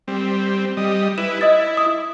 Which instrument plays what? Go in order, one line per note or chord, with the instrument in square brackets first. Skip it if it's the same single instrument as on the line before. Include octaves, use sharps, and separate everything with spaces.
[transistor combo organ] G3 C4
G3 D#5
[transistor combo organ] E4 B4 [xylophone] E7
[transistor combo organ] E4 [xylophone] D#5 D#6 A6
[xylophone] D#6